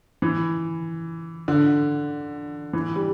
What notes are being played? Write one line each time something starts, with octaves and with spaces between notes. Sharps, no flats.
E3
D3
E3
G3